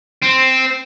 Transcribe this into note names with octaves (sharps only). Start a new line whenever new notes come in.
C4